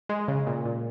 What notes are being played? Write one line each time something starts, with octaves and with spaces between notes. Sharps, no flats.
G#3
C#3
A#2
A#2